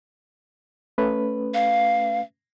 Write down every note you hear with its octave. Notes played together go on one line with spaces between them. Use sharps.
A3 C#4 B4
F5